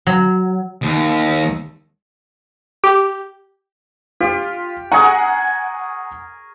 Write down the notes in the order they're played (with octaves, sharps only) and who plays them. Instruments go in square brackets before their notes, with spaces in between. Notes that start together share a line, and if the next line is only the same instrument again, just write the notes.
[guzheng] F#3
[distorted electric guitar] D#2
[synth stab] G4
[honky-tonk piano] F4 [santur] G4
[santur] G#4 A#4 C#6 [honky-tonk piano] F#5 G#5 A#5